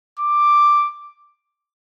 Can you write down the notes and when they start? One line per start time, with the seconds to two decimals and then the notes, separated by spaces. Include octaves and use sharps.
0.19 D6